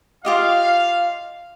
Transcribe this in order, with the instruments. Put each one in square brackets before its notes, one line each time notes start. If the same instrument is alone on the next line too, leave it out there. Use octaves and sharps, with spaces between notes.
[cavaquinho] F4 G4 D#5 [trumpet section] F5